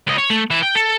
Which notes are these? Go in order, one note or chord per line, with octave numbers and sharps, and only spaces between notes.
C#2 D#5
C#5
A3
E3 E5
G5
A4